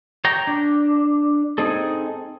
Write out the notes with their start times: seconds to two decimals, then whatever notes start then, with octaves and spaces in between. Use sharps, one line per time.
0.25 C#5 G5 A#5
0.47 D4
1.58 C4 D#4 G#4 A4